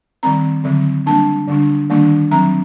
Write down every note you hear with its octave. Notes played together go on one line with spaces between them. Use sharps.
D#3 G3 C4 A#5
D3 F#3 C4
G3 A#3 D4 A5
D3 G3 D4
D#3 G3 A#3 D4
F#3 C4 A#5